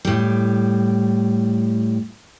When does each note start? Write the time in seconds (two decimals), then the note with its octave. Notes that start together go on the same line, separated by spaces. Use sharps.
0.05 A2 G3